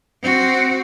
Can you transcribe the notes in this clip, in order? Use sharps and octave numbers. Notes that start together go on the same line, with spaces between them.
C4 F#4